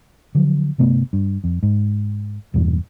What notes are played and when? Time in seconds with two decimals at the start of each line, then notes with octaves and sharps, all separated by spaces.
0.35 D3 F3 F#3
0.78 G1 C3 A3 B3
1.13 G2
1.44 F2
1.63 G#2
2.54 E1 E2 G2 A#2